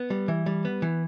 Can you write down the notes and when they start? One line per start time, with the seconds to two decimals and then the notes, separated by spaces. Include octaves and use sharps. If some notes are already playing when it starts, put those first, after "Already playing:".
Already playing: B3
0.10 G3
0.28 E3
0.46 G3
0.65 B3
0.82 E3